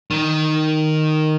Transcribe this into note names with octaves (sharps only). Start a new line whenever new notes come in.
D#3